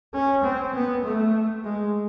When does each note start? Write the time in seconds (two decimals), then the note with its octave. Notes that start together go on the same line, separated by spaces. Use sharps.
0.14 C#4
0.44 C4
0.74 B3
1.04 A3
1.64 G#3